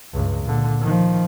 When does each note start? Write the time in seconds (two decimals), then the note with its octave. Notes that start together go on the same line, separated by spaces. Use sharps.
0.13 C#2 G2
0.43 A#2 D3
0.81 D#3 F3